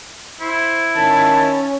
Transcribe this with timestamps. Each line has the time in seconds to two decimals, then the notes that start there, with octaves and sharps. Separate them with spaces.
0.41 E4 C5
0.96 D#3 C#4 A5